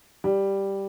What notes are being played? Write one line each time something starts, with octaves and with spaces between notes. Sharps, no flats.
G3